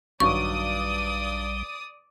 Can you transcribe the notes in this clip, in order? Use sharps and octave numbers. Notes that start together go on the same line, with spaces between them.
A#1 G2 D#3 F#3 G3 D5 C#6 D#6